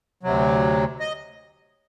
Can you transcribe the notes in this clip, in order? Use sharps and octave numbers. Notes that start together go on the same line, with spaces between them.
D2 C3 F#3
D#5